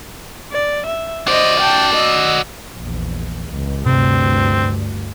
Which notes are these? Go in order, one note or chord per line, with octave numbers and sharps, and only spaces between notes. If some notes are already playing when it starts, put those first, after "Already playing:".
D5
E5
F#4 C5 D5 D#5
G5 A5
D#5 E6
A#1 E2
C#2
D2 G2 C3 C4